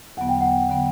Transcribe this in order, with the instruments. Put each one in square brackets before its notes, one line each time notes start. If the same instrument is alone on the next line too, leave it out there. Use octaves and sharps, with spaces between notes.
[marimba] E2 D3 F#3 B3 [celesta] F#5
[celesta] G5
F#5
[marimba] D3 F#3 B3